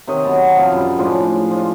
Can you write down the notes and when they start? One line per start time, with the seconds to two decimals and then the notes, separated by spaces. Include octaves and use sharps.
0.07 C3 D#3 C#5 D#5
0.24 F#3 B3 F#5 A5
0.56 C3 F3 F5
0.72 F#2 G3
0.98 A2 F3 G#3 D4
1.50 F3 F4